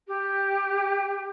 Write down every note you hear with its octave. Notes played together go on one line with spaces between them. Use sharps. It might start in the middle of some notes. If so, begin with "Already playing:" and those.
G4